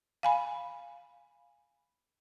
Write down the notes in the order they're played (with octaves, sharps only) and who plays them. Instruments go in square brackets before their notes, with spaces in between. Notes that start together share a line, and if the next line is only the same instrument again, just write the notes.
[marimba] F5 G#5 B5